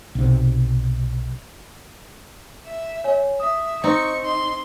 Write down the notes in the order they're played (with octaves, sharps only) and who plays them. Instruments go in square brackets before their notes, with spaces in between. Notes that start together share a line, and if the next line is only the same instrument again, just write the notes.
[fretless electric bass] B1 C3
[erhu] E5
[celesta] C#5 G#5
[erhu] E5 [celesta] D#6
[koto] C4 D#4 [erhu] C#6
[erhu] C6